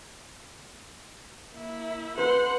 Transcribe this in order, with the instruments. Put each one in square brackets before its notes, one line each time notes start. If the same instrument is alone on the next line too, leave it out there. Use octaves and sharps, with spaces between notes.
[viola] A#3 E4
[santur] B4 C5 [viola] F#5 C6